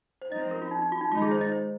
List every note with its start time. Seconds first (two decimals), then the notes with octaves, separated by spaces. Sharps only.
0.22 C5
0.31 F3 C4 D#4 D#5
0.42 C5
0.51 A#4
0.62 F4
0.71 D#4
0.82 D#4
0.92 F4
1.01 D#4
1.11 D#3 G#3 D#4 F4
1.22 G#4
1.31 C5
1.41 D#5
1.52 C5